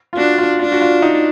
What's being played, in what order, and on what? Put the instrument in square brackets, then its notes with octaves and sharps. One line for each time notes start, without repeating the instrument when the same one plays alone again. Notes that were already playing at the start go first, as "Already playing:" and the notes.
[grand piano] F4
[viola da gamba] D4 [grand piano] F#4
[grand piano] F4
[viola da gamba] D4 [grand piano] F4
[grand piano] F#4
F4
D#4